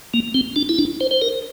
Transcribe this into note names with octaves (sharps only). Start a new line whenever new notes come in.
A#3
C4
D4
E4
D4
C5
C5
A#4